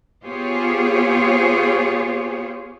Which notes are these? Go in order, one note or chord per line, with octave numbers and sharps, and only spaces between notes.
B3 F4 G4 G#4 C5 C#5